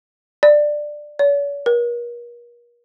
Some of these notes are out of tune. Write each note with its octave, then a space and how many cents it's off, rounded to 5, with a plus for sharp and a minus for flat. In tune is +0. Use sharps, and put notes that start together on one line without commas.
D5 +10
C#5 +45
A#4 +40